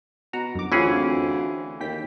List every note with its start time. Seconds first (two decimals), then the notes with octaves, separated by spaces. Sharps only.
0.33 B2 F#4 A#5
0.55 G1 F#2 D6
0.72 D2 E3 C4 C#4 F4 G#4
1.81 D#2 G5 B6